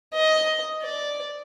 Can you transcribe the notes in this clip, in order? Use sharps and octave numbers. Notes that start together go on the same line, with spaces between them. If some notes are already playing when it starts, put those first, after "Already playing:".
D#5
D5